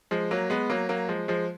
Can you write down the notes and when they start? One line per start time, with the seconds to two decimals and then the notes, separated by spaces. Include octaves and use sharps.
0.11 F3 G#3
0.31 F#3 A#3
0.50 G#3 B3
0.70 F#3 A#3
0.89 F#3 A#3
1.09 F3 G#3
1.28 F3 G#3